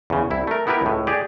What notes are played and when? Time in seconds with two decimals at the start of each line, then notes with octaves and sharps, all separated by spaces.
0.10 E2 C#3
0.30 C2 E4
0.47 A3 A#4
0.67 B3 E4 G4 A#4 B4
0.82 C#2 A2
1.07 G4 G#4 D5